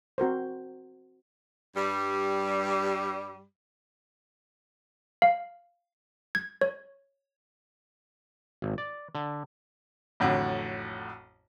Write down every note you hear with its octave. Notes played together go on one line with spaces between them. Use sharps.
C4 F#4 A#4 C5
G2 G3
F5
G#6
C#5
G#1
D5
D3
A1 F2 A2 D3 F#3